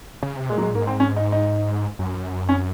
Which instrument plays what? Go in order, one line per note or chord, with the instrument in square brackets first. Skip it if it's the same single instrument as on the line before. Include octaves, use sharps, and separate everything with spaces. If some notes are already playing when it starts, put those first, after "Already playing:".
[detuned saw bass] C#3
C3
[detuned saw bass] A#2 [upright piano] G#3
[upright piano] F#3
G#3
[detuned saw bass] G#2 [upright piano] A#3
[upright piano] C4
C#4
D#4
D#4
[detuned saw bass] F#2
[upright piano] C#4